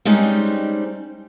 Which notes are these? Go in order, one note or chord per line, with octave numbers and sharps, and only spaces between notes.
G3 G#3 C4 C#4 D#4